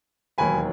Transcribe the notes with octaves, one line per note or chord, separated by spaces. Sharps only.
E1 D#2 D#3 F#3 G#5 B5